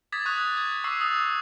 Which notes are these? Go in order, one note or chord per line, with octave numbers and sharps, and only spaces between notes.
D6 D#6 G#6 A6 B6
C#6 D#6 F#6 F7
G#6
C#6 D6 E6 C7
D#6 E6 F7